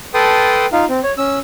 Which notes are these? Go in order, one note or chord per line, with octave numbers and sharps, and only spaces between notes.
A4 B4 G5 A5 C6 D#6
D#4 F4 F5
C4
C#5
C#4 E6